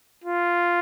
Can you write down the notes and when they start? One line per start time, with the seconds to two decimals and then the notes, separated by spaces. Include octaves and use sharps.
0.24 F4